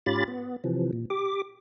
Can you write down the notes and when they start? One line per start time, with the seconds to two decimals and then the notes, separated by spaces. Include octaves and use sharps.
0.06 G#2 C#4 F4 G4 B5 A6
0.28 B3
0.64 C3 E3 F3
0.93 A#2
1.10 G4 D6